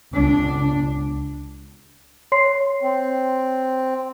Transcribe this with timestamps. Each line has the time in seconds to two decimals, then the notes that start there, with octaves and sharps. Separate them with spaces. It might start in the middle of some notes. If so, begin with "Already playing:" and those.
0.13 C#2 D4
2.32 C#5 C6 C7
2.83 C4